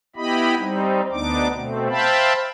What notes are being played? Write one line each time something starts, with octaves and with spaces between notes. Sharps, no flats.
B3 E4 G4 D#5 B5
G3 C4 D#4
D2 B3 D4 D#4 D6
B2 A3 C4
C5 E5 F5 G5 A5 B5